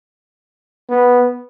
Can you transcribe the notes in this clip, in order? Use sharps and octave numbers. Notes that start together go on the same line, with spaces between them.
B3